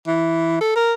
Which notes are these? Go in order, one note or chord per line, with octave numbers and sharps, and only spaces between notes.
E3
A4
A#4